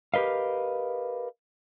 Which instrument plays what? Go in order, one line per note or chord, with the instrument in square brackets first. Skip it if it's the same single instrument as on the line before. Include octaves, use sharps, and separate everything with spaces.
[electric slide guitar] G4 A#4 B4 D#5 F5